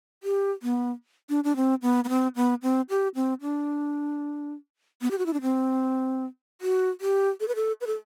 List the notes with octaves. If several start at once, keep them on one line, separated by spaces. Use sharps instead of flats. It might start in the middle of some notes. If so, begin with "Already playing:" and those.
G4
B3
D4
D4
C4
B3
B3
C4
B3
C4
G4
C4
D4
B3
G4
F#4
E4
D4
C4
F#4
G4
A4
B4
A4
B4
A4